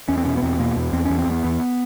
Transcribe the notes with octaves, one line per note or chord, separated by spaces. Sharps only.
E2 C#4
C4
B2 C#4
B3
E2 C4
B2 A#3
E2
E2 C4
E2 C#4
C4
E2 B3
E2